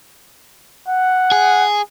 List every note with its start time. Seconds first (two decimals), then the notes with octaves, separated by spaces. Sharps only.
0.88 F#5
1.32 G#4